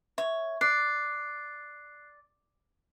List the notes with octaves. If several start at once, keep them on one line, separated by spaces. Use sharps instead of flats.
C#5 E5
D5 F#6 C7